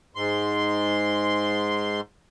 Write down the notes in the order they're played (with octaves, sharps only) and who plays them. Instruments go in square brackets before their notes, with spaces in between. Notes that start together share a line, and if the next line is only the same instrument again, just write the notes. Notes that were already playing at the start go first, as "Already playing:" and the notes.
[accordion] G#2 C6